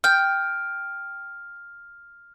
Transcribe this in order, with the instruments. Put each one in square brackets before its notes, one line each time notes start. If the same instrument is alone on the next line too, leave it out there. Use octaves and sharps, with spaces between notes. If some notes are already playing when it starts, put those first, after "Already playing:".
[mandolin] G5 [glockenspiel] F6